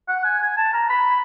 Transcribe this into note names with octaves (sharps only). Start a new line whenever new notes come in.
F#5
G#5
G#5
A5
A#5
B5